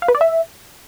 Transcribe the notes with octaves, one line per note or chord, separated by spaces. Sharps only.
F5
B4
D5
E5